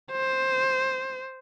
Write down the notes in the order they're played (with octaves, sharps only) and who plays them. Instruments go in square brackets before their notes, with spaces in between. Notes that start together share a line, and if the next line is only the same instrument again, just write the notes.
[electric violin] C5